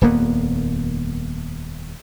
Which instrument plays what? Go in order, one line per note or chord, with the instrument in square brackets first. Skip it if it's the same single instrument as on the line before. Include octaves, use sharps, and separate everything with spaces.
[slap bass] D#1 F2 A#3 B3